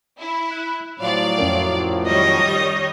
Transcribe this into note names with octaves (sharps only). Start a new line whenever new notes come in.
E4
F#6
A2 F3 F#3 D5 F5
F2 C#4 A#4
D#3 G3 C#5 D#5